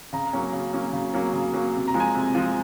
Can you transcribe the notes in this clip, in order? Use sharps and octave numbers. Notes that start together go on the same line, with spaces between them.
C#3 A#5
F#3 A#3 C#4
C#3
F#3 A#3 C#4
C#3
F#3 A#3 C#4
C#3
F#3 A#3 C#4
C3
A#5
F3 G#3
G#5
C3
F3 G#3